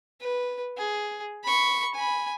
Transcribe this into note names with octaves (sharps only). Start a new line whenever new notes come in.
B4
G#4
B5 C#6
G#5 B5